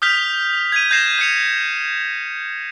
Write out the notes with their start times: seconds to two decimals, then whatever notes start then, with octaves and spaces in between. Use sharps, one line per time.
0.02 D#6 F6 G6 B6 F7
0.72 G#6 D#7
0.91 G6 G#6 A#6 C7 E7
1.19 G6 C#7 F7